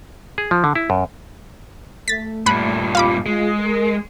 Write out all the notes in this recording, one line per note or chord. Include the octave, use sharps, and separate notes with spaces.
G#4
F3
D3
E4
F#2
A3 A6 B6
G2 A#2 B5 F#6
G3 C4 F4 F5 B5 D6
G#3 F4 G#4
A#4